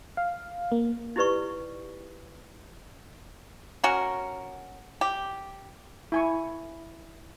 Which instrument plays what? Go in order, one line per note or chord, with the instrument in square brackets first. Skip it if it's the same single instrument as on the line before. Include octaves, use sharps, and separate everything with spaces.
[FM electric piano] F5
A#3
[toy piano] D#4 E4 G4 B4 D5 C#6
[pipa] C#4 F#4 A#4
G4
[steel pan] E4 G#5 C#6